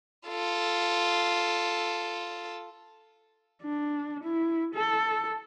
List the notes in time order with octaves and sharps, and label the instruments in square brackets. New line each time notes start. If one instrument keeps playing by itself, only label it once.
[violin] F4 A4
[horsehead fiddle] D4
E4
A4